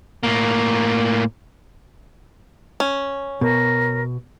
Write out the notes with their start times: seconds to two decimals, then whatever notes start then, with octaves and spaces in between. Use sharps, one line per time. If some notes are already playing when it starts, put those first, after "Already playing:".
0.23 A2 A#3
2.80 C#4
3.41 B2 A#4